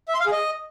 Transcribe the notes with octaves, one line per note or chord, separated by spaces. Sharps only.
E5
C6
F5
G#4
D#5